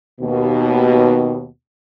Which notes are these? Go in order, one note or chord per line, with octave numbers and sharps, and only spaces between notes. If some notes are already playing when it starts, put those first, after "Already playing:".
D#2 B2